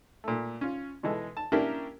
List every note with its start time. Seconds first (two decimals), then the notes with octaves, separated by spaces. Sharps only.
0.24 A#2 A3
0.61 C#4 F4
1.03 B2 E3 G#3 A4
1.37 A5
1.52 A#3 C#4 D4 E4 G4 A#4